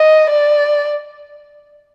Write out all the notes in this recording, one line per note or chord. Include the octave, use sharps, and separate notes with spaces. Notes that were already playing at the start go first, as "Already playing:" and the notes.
Already playing: D#5
D5